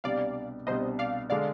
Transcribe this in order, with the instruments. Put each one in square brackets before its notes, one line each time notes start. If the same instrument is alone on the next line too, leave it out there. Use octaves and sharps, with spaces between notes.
[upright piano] C2 B2 G3 D4 [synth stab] D5 F5
[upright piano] C2 B2 G3 D4 [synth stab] C5 D#5
[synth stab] D5 F5
[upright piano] D3 G#3 [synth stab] D5 F5